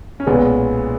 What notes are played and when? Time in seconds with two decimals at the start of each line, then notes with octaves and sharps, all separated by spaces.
0.20 C#4
0.27 B1 A#2 G#3 B3